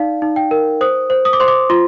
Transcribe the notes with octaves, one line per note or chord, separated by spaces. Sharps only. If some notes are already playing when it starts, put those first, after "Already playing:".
Already playing: D#4 D5 F5
D#4
G5
A#4
C5 D#6
C5
D#6
D6
C5 C6
D6
F4 C6